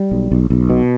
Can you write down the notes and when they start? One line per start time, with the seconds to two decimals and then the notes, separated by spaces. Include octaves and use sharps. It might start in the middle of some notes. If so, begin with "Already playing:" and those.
Already playing: G3
0.12 B1
0.32 B1
0.50 B1
0.70 B2